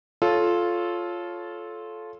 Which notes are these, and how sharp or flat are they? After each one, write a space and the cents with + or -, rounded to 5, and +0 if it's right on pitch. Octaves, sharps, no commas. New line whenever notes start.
F4 +0 A4 -15 C#5 +0